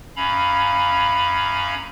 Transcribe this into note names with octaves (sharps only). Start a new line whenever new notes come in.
F#2 C#4 F5 A#5 B5